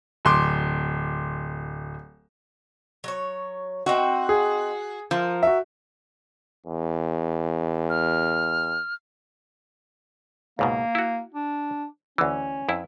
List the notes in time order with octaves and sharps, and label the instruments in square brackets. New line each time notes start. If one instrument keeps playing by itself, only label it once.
[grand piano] D1 C6 D6
[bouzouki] F#3 C#5
[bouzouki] C4 D#4 E5 [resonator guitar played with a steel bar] F#4
[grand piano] G#4
[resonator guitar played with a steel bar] F3 [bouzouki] A#4
[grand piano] F#4 E5
[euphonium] E2
[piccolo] F6
[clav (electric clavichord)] C#2 G#2 B2 [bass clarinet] A#3
[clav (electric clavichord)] E4 F#4
[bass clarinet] D4
[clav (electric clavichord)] D2 E3 [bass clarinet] C#4
[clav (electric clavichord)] F2 E4